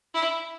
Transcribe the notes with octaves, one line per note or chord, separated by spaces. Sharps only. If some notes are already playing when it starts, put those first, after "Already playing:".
E4